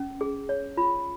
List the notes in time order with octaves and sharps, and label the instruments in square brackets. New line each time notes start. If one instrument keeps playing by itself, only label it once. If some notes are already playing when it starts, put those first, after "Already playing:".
Already playing: [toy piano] C#4
G#4
C#5
F4 B5